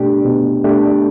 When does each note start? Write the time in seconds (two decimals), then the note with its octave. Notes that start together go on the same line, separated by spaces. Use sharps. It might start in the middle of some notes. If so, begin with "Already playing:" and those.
Already playing: B2 A3 D4 G4
0.25 B2
0.64 A3 D4 G4